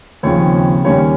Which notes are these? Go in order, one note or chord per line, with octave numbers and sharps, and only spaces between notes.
D#2 C#3 F3 C4 C#5
D#2 D#3 G3 A#3 C#4 C#5